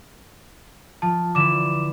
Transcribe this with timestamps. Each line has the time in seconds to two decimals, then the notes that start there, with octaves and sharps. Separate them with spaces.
1.02 F3 A5
1.35 D3 E3 B4 D6 E7